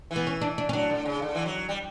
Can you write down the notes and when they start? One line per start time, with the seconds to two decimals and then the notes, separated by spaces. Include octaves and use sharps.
0.11 E3
0.16 B3
0.27 C#4
0.42 D4
0.58 D4
0.69 C#4
0.73 F#3 D4
0.90 D3
1.05 C#3
1.22 D3
1.35 E3
1.46 F#3
1.69 G3